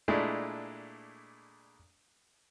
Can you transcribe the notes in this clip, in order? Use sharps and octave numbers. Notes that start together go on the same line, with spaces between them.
A#2 G#3 A3 D4 E4